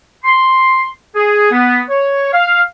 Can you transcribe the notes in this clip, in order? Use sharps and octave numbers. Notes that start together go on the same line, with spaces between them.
C6
G#4
B3
C#5
F5